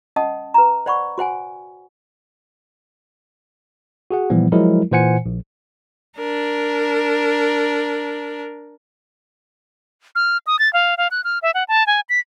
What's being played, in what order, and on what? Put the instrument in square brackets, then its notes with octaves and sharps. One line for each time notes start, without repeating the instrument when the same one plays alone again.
[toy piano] C#4 D#5 F#5 A5 D#6
B4 A#5
C5 D5 F#5 B5 C#6
F#4 C5 F#5 G#5
[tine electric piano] F#4 G#4 F#5
A#2 E3 F3 G3 B3
F3 F#3 G#3 E4 A#4
A#2 E3 C5 F#5 G#5 C#7
A#1
[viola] D4 A#4
[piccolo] F6
D#6
A6
F5
F5
F#6
F6
E5
F#5
A5
G#5
B6